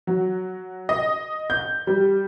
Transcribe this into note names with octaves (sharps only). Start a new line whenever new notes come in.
F#3
D#5
G6
G3